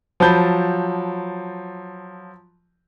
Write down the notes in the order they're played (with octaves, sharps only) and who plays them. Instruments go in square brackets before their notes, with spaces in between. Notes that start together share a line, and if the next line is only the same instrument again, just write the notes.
[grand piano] F3 F#3 A5 B5 G6